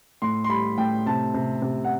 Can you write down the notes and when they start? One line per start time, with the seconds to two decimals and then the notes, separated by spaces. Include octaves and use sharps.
0.22 A2 C6
0.44 C6
0.49 G3 B5
0.78 A2 G5
1.06 C3 A5
1.34 C3
1.62 C3
1.84 F#5